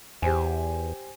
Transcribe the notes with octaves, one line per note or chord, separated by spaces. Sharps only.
E2 G4 C5 G#5